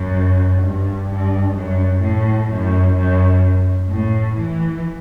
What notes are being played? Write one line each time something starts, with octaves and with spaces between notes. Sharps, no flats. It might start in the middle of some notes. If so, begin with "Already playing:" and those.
Already playing: F#2
G2
G2
F#2
A2
F#2
F#2
A2
E3